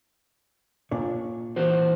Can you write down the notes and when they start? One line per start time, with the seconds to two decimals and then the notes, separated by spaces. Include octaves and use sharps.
0.91 A#2 D4 C#5
1.56 E3 F#4 C5